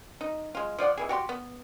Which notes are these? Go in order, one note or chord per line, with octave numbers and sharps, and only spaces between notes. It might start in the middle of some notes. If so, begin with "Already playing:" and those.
D#4
G#3 F4
F3 F4 D5 F#5
B2 E3 G#4
F#4 G4 F5 C6
B3